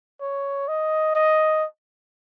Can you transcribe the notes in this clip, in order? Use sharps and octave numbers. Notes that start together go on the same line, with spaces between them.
C#5
D#5
D#5